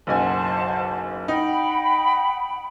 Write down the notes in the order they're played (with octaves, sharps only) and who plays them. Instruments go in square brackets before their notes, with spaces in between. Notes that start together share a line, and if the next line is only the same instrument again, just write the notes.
[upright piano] F#1 B1 G#5 [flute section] C5 F#5 A5
[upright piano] D#4 [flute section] F#5 G5 B5